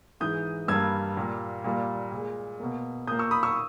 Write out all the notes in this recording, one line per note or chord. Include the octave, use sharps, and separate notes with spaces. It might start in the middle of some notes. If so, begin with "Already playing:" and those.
G#2 E3 G#3 D#6 G6
G2 G3 A#3 E6 G#6
A#2 G3 A#3
A#2 G3 A#3
A#2 G#3
B2 A#3
A#2 A#3 D#6 G6
C#6 E6
B5 D#6
C#6 E6